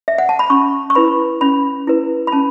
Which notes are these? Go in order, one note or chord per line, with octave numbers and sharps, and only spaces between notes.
E5
F#5
A5
B5
C#4 C#6
C#6
E4 B4 B5
C#4 B5
E4 B4
B5
C#4 A5